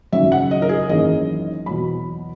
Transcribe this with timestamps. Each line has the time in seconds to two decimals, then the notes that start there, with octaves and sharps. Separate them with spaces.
0.12 G#1 F#2 C#3 F#3 E5
0.32 F#5
0.51 D#5
0.62 A#4
0.69 G#4
0.89 G#1 F#2 E3 A#3 C#4 D#5
1.66 E2 B2 F#3 B5